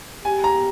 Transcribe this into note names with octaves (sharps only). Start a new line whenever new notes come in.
G4 G#5
A#5